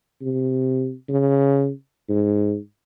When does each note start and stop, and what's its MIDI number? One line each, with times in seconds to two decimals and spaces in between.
0.22 0.93 48
1.09 1.70 49
2.09 2.56 44